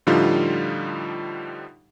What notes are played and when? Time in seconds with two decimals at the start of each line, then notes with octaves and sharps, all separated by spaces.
0.07 A2 D3 F3 G3 D#4 F4